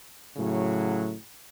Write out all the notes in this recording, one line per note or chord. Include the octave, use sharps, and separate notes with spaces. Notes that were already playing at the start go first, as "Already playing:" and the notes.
A2 C#3 F#3